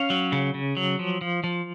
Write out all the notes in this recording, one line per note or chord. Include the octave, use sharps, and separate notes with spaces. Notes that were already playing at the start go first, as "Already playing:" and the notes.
Already playing: C#4 F5
F#3
C#3
C#3
F#3
F3
F3
F3